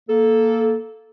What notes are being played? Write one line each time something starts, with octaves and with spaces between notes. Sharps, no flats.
A#3 A4